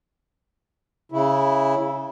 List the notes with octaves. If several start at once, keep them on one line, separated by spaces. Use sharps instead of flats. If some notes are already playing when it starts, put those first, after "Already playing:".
C#3 E4